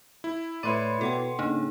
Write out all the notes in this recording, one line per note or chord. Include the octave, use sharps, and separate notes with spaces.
E4
A2 E4 B4 C#5 D5 B5 C6 D#7
B2 A4 F#5 G5
G#2 C#3 A#3 D4 D#4